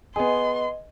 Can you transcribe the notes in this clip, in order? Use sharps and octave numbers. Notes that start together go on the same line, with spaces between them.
B3 G#4 D#5 C6